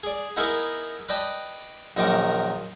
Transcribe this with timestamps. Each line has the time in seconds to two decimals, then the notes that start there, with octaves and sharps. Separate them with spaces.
0.03 G#4 D5
0.37 B3 D#4 E4 G#4 A#4 B4
1.09 B4 D5 D#5 G5 A5
1.97 A#1 F#2 D#3 D#4 D6 D#6